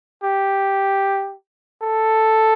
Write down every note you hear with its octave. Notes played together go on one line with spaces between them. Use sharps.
G4
A4